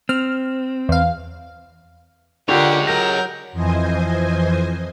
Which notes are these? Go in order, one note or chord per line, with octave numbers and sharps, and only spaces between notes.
C4 F6
E2 F5
D3 G#3 F4 G4 A#4 C#5 F#5 G5
F#3 A#4 G6 A#6
F2 E3 F3 C5 D#5 G#5